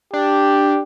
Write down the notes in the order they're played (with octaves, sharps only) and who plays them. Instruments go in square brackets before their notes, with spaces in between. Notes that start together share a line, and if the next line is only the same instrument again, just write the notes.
[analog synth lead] D4 [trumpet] G4